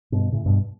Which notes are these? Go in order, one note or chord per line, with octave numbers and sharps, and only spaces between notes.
G2 B2
A2 C#3
G2 B2